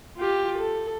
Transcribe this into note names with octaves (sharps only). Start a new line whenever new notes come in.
F4 G4
A4